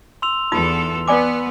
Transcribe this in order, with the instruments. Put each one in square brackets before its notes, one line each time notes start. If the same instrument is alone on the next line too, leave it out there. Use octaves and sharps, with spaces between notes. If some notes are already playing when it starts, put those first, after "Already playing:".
[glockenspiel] C6 E6 F7
[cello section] E2 A4 [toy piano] D#4 F4 D#6
[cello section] B3 [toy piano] D5 G#5 D6